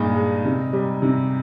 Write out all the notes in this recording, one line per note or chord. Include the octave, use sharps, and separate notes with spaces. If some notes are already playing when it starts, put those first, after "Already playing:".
Already playing: G2 A#2 G#3 D#4
G#3
C3
G3
C3